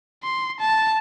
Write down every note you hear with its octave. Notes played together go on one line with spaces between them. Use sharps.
C6
A5